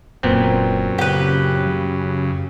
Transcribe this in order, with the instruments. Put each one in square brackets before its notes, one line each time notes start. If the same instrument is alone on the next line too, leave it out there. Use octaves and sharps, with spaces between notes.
[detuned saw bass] E1 [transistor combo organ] F#2 [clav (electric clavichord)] A#2 B3 C4
[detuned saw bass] C#3 [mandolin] G4 B4